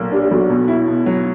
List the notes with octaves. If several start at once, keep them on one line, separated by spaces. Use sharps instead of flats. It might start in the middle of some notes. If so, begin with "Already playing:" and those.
Already playing: B1 A#2 A#3
D4 G4
G4
B1 F#4
B2
E4
B2
F#3